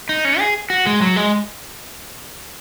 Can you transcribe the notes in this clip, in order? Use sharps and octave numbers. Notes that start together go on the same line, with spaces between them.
D#4
C#4
G#4
F#4
G#3
F#3
G#3